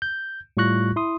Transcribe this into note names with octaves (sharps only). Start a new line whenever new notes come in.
G6
A2 G3 F4 C#6 F#6 A#6
E4 C6 D#6